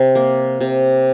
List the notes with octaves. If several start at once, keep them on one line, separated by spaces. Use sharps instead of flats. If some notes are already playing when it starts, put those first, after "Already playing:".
Already playing: C3 C5
A#3
C3